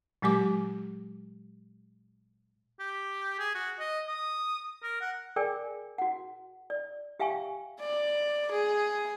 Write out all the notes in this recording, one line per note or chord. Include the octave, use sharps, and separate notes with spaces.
A#2 F#3 G#3 G4 D6
G4
G#4
F#4
D#5
D#6
A#4
F#5
G#4 A#4 D5 G5 G#5
F#4 F#5
D5
G4 E5 F5 G5 G#5 C#6
D5
G#4